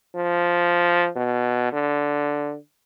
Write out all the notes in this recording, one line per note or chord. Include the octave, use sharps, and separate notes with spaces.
F3
B2
D3